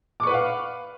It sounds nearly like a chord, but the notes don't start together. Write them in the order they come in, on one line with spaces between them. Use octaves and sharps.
D6 C#6 B4 F#5 F5